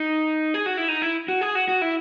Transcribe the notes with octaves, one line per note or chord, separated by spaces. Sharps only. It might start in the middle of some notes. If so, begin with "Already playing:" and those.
Already playing: D#4
G#4
F#4
E4
D#4
E4
F#4
G#4
F#4
F#4
E4